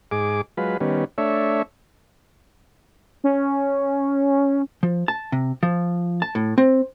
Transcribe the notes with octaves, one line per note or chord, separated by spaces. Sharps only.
G#2 G#4 D6
F#3 G#3 F4 B4
D#3 G3 B3 C#4
A3 D4 C#5 E5
C#4
F3
A5
C3
F3
A5
A2
C4